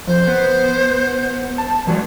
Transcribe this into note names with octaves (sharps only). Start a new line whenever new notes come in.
F2 C5
B3
A5
E3 F#3 G#3